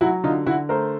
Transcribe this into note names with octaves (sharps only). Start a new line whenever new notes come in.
F#3 E4 F#4
D3 D#4 F4
D3 E4 F#4
A3 A#4 C5